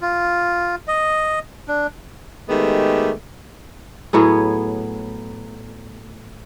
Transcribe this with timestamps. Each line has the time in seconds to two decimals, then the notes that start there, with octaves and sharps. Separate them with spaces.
0.01 F4
0.88 D#5
1.68 D4
2.49 D#3 G#3 A3 B3 G4
4.13 A2 F#3 B3 G#4